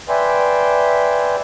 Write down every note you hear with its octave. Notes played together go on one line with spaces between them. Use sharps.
B4 D5 E5 G5 G#5 C6